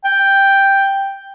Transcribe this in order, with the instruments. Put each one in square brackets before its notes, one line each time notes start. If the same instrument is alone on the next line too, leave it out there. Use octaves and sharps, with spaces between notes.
[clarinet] G5